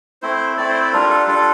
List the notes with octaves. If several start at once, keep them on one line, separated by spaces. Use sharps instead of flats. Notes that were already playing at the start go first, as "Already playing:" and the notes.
A3 C4 E4 C5
A3 C4 E4 D5
C5
D5
G3 D4 F4 A#4
A4
G3 D4 F4 A4